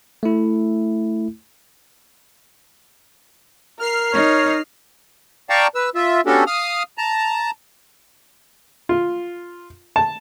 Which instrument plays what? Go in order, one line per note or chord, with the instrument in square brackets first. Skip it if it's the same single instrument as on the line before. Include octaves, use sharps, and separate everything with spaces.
[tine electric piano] A3 E4
[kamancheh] A#4 [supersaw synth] F6 C7
[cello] D#4 [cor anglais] C#5
[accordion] D5 F5 G5 A5 A#5 C#6
B4 E6
F4 E5
B3 C#4 D4 F#4 G4 A4
F5 D#6 F6
A5 A#5
[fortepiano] F4
A5